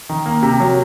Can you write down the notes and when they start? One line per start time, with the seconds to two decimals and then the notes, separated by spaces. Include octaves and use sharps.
0.09 D#3
0.26 A#3
0.43 C3
0.60 F#3